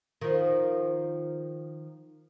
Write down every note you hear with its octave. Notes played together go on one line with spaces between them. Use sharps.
D#3 F3